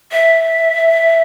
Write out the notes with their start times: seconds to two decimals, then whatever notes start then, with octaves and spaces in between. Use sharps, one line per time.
0.12 E5